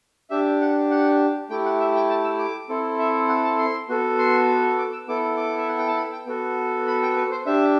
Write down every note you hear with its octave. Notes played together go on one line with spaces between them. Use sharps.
D4 G4 E5
F#5
F#5
A3 E4 G4 G5
F#5
E5
G5
A5
E6
D6
C4 E4 A4
E5
F#5
A5
C6
B3 F#4 A4
C6
D6
E6
B3 E4 A4 D6
D6
E5
F#5
G5
A5
B5
G5
B3 F#4 A4
B5
G5
B4
C5
D4 G4 E5